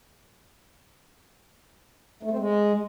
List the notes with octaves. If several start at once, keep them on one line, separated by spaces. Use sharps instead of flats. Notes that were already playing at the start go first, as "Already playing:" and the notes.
A3
C4
G#3